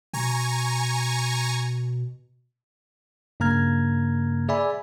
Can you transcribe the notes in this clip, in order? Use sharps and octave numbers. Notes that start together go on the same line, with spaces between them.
B2 G#5 A#5 C#6
G2 C#3 A#3 A#5 F6 G#6
G#4 D5 E5 G#5 B5